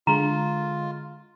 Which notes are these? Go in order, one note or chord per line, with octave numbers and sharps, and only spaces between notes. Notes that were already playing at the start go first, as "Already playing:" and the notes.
D3 G#3 F4 A#5